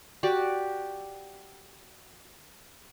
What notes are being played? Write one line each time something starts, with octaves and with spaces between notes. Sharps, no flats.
F#4 G4 D5